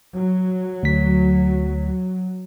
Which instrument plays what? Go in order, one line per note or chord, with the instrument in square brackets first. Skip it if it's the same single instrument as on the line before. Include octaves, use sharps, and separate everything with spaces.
[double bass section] F#3
[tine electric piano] D2 B6